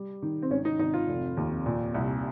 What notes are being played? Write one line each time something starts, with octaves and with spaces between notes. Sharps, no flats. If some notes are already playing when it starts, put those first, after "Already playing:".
Already playing: G3
D#3
C4
G#1 C#4
D#4
G#1 D#4
F4
F1
D#2
A#2
C2